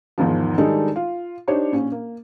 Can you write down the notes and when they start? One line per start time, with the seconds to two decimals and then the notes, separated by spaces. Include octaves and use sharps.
0.18 E2 G#2 D#3 F3
0.58 D#3 G3 G#3 D4 D#4 A4
0.96 F4
1.48 D4 D#4 G4 C5 C#5
1.72 A#1 C#4
1.92 A#3